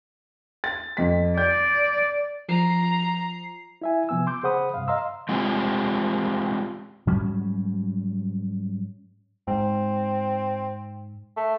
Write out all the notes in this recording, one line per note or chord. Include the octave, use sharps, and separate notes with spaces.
A6
F2 B6
D5 G6
F3 A#5 C7
E4 E5 G#5
C3 F3 B3 G#5 E6
C6 D6 G6
C#3 G#4 C5 F#5 B5 D#6
G2 C3 F5
D#5 F5 A#5 C6 E6
G#3 C4 F4 G4
G#2 F#3 G3 C#4
G#2 C4
A3